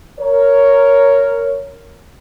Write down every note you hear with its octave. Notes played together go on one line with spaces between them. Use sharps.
A#4 C#5